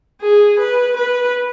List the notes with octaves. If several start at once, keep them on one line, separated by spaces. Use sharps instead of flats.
G#4
B4
B4